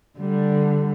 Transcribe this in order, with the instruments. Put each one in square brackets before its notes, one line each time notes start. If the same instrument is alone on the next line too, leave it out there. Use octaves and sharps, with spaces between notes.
[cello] D3 G3